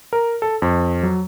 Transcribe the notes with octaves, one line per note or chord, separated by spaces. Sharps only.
A#4
A4
F2
F#3